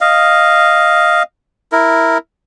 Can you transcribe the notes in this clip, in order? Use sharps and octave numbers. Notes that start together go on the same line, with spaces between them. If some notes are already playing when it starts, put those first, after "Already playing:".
D#5 F5
E4 A#4